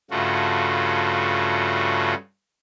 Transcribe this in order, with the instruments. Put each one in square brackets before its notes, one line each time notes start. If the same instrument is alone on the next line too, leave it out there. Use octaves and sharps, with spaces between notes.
[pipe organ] G2 C#3 A3 F4 F#4